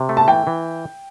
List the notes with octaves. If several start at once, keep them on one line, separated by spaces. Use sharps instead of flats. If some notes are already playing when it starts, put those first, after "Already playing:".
Already playing: C3
A3
A5
E3 G5
E3